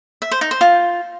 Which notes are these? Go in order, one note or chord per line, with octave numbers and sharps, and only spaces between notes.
E5
C5
D#4
C5
F4